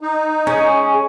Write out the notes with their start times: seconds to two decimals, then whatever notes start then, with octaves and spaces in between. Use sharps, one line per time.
0.01 D#4
0.47 G#3 C#4 G#4